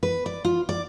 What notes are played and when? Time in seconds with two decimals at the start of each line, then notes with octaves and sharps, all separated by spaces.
0.03 B4
0.26 D5
0.45 F4
0.69 D5